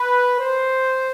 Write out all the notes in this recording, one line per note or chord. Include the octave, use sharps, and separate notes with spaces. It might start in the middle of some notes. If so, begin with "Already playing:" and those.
Already playing: B4
C5